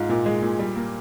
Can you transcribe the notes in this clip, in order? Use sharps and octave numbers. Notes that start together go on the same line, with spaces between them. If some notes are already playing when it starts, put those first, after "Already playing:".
Already playing: G#2 F4
A#2
G#3
A#2
G3
A#3